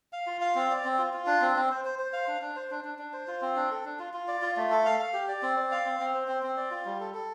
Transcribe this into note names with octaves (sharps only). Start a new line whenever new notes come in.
F5
F4
F5
C4
D5
C4
F4
F4
D4
C4
C4
C5
C5
C5
F5
D4
D4
C5
D4
D4
D4
C5
F4
C4
D4
A4
D4
F4
F4
D5
F4
A3
A4
F5
F5
G4
D5
C4
D5
F5
C4
C4
C5
C4
C4
D5
F4
G3
A4
A4